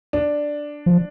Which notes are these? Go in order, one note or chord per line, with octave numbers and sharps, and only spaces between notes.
D4
F3